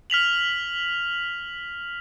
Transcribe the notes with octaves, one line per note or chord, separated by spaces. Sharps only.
F6 B6 F7 F#7